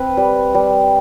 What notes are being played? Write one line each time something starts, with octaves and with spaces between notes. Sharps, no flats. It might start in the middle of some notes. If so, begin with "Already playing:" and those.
Already playing: C4 B4
G3
G3